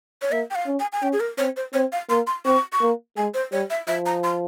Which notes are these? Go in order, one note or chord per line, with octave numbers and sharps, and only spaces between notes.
C#5
A#3 E5
G5
F5
C#4
G#5
G#5
C#4 G5
G#4
A#4
C4 C#5
C5
C4 C#5
F5
A#3 C6
C6
C4 C#6
C#6
A#3
G#3 G#5
C5
G3 C#5
E5
F3 E5
A#5
C6